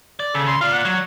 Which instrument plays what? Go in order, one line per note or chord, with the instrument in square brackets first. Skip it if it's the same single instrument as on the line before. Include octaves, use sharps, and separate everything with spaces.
[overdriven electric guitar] D5
[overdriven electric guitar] C#3 [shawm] A4
[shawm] C6
[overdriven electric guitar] F4 D5 [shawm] F5
[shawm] F#5
[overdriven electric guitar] F#3